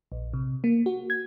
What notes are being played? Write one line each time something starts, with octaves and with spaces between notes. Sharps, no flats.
A#1
C3
A#3
F#4
G#6